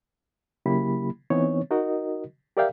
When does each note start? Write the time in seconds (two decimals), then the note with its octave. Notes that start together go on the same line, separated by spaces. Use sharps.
0.66 C#3 F#3 A#3 E4 G4 B5
1.30 E3 B3 C4 D#4 C#5
1.70 D#4 F#4 A#4 D#5
2.57 G4 A#4 D5 E5 F5 G5